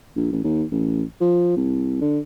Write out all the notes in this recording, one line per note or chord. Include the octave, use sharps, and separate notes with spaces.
A#1
A1
D#2
A1
F3
C2
D3